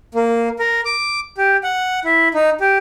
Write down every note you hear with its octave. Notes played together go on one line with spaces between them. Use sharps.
A#3
A#4
D6
G4
F#5
E4
D#4
G4